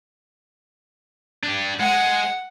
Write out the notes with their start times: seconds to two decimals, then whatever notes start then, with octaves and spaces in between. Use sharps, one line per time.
1.43 D4 G4
1.80 G#3 F#5